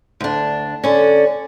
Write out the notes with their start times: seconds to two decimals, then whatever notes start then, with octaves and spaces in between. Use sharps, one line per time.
0.21 D2 D4
0.84 D3 C#4 D5